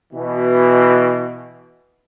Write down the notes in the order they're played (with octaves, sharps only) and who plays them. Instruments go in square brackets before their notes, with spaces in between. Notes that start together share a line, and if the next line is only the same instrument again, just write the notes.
[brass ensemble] B2 E3